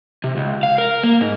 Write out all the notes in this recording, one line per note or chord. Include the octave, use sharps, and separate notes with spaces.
C3
C#2
F5
A#4
A#3
G#2